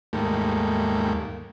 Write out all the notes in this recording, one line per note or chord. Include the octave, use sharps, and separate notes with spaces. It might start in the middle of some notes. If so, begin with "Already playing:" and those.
D#2 G#2 G3 A3 A#3